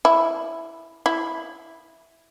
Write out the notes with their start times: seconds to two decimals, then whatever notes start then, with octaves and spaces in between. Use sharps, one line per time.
0.05 E4
1.06 E4